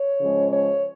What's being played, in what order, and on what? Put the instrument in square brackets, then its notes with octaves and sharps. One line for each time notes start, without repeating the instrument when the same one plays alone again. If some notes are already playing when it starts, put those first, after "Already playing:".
Already playing: [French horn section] C#5
C#3 F3 G#3 C#4
C#5